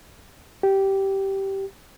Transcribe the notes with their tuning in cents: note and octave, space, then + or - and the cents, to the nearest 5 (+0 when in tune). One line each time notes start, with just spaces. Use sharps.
G4 -10